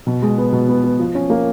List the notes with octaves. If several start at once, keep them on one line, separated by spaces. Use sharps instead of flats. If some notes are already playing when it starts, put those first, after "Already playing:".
B2
G#3
B3
B2
B3
B3
F3
C#4
A#3